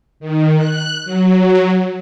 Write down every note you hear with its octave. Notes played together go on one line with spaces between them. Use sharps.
D#3
F#6
F#3